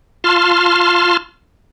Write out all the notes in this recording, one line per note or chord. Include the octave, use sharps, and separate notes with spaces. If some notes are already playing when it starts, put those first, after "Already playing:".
F4 A5 C6 F6